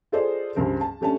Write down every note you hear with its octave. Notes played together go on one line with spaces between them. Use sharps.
F4 G#4 A4 C5 D5 D#5
C#2 G2 A#4 C5
A5
G3 A3 C#4 D4 A5